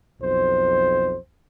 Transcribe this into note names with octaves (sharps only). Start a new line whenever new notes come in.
B1 F2 C5